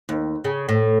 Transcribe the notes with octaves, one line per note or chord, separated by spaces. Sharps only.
D#2
C#3
A2